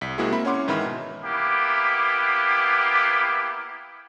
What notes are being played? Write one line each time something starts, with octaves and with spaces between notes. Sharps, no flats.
C2 B6
C3 G#3 A#3 E4 F#4 G#4
A#3 C4 E5 B5
C#4 E4 C#5 F#5 C6 D6
G#2 D#3 E3 E5 B5 F6
B2
A#3 B3 E4 G4